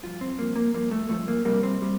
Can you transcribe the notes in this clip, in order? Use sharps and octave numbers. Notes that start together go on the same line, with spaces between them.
G2 F3 F4
C4
G2 F3 A#3
A#3
G2 F3 A#3
A3
G2 F3 A3
A#3
C2 C3 G3 A#3
C4
C3 G3